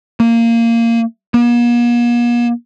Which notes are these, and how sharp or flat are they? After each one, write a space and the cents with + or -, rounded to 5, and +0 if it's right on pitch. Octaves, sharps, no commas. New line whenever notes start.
A#3 -15
A#3 +45